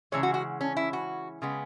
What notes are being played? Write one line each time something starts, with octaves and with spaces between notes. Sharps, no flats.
C#3 E3 G#3 C#5
F#4
F#4
C#4
E4
F#4
C#3 G#3 B3